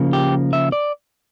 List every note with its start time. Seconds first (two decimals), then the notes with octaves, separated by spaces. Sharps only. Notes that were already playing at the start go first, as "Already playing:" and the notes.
Already playing: C#3 F3 A#3
0.13 G4
0.53 E5
0.72 D5